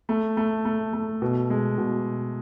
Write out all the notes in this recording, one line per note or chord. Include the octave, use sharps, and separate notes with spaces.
A3
A3
A3
A3
B2
G#3
B2